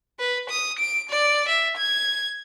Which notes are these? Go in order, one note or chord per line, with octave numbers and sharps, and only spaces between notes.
B4
D#6
D7
D5
E5
G#6